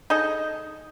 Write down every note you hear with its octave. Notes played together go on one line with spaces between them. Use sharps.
D#4 G#4 A4 D#5